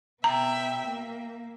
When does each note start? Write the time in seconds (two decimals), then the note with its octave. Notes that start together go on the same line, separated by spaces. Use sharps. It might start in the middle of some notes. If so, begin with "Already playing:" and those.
0.24 B2 E5 G5 A#5
0.88 A#3